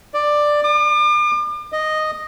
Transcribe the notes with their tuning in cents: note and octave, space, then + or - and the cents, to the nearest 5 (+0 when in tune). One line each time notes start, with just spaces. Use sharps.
D5 +10
D6 +40
D#5 -5